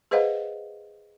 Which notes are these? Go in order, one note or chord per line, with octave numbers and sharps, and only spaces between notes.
G#4 B4 C5 D#5 F5 F#5